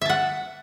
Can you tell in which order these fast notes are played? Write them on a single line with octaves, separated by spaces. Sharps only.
E5 A5 F#5